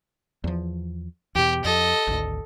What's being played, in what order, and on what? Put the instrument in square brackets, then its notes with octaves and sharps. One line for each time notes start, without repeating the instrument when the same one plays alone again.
[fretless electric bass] E2 F3
[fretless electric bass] E2 B2 [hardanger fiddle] G4
[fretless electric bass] F2 [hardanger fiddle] A4 D#5
[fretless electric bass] G#1 D2